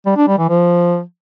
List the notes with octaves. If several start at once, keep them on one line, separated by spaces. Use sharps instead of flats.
G3
D4
G3
E3
F3